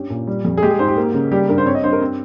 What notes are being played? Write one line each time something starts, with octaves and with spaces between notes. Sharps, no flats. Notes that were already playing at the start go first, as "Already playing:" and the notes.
Already playing: G2 C#4 G4
A#2
G3
F2
G#4
G#3 G4
G#4
G#2 C5
G4
A#3
C#3
G3 G4
G2 A#4
C5
C4 C#5
D#5
G2 C5
A#4
C4